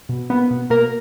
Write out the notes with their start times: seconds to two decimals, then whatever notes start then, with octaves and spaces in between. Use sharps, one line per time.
0.09 B2
0.30 A#3 B3
0.51 B2
0.70 B2 A#3 A#4